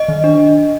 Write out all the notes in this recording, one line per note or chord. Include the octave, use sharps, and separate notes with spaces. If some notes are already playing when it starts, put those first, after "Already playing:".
Already playing: D#5
D#3
D4